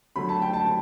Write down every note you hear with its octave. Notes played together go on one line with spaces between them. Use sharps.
D3 F#3 A3 B5
A5
G5
A5
A5